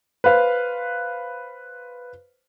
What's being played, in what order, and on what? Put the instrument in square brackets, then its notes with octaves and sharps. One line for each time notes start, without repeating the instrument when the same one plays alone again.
[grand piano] B4 C5 F5